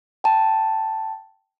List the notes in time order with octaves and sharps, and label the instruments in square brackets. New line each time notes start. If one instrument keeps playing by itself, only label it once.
[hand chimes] G5 A5